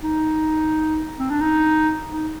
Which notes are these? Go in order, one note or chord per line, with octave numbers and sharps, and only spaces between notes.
D#4
C4
D4
D#4
D#4